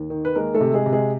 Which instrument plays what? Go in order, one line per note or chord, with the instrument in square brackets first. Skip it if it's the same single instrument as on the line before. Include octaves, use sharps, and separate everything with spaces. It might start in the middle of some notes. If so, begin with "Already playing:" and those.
Already playing: [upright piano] D#2
D#3
B4
G#3 A#3 A#4
A3 A4
C3
G#3 G#4
C3
G#3 G#4